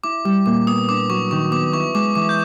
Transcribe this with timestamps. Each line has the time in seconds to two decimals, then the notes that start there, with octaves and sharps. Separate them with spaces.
0.04 E4 D6
0.25 G3 D6
0.46 A#2 D6
0.67 B3 D#6
0.89 D4 D6
1.10 F#3 C#6
1.31 D#3 C#6
1.52 B3 D6
1.73 E4 C#6
1.94 G#3 D6
2.15 E3 D6
2.29 G6